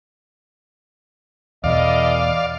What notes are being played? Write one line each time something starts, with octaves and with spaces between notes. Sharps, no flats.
E2 B2 E3 A3 D5 D#5 F5